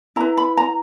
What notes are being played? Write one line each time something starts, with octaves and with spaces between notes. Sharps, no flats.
E4 B4 A#5
B5
A#5